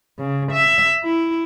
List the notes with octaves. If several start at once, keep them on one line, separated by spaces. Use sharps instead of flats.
C#3
E5
E4